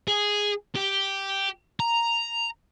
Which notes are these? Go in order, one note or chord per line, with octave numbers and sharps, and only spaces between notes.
G#4
G4
A#5